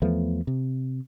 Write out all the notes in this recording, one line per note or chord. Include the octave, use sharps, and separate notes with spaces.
E2 F3 A3 B3
C3